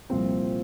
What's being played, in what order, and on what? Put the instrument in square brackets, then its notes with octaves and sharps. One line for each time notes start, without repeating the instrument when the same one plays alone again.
[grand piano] C2 A#2 F3 C4